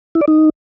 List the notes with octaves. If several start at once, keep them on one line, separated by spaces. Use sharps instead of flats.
E4
D5
D#4